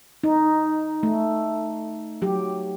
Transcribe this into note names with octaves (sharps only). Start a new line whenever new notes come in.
D#4
A3
F#3 G4